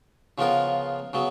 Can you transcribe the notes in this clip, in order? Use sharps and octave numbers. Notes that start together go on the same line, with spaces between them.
C#3 F3 B3 F4 A#4
C#3 F#3 B3